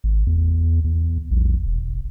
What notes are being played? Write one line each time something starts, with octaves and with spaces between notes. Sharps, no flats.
G#1
E2
E2
A#1
E1